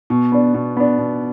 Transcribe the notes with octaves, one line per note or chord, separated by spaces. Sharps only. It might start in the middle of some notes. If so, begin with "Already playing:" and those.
B2
B3 D4
B2
B3 D4
B2